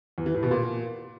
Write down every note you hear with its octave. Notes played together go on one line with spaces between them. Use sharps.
E2
E3
A2
B2
A#2